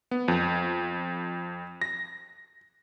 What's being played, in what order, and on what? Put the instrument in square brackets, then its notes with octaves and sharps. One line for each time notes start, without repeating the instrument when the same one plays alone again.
[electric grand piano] B3
F2
A#6